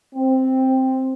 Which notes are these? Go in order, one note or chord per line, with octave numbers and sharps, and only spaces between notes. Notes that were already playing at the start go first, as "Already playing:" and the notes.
C4